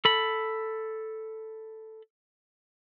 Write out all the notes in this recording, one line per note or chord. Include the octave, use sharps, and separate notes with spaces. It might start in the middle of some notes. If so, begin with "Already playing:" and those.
A4 B5